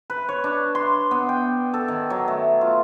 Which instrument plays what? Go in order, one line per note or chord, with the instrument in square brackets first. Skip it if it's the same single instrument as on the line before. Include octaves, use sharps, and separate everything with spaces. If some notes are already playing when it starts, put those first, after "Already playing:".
[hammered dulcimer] B4
C#5
D4
C6
B3
G5
A4
D#3
F#3
A3
F4